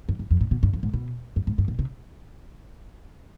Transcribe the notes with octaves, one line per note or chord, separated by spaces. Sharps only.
G2
G2
F2
G#2
B2
G2
F2
G#2
B2
G2
G#2
G2
B2
C3